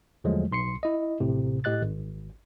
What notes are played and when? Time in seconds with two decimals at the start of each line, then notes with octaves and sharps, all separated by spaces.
0.24 E2 D3 F3 F#3 G#3 A3
0.52 B1 C6 C7 C#7
0.83 E4 D#5
1.20 A1 A2 C3
1.64 A2 G4 D#5 F#6 A6
1.82 G#1